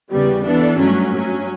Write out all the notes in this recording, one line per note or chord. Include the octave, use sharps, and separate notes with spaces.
E2 C#3 G3 B3
E3 B3 D4 A4
G2 F#3 A3 C#4
G2 F#3 C#4